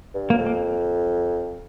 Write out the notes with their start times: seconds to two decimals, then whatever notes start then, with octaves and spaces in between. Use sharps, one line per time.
0.14 G2
0.30 A#3
0.33 F#2
0.38 F2
0.47 A#3